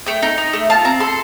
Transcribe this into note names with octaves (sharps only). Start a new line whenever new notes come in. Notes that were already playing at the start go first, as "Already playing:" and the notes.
A3 G5
D#4
D#4
A3
F4 A5
C4 A#5
A4 C6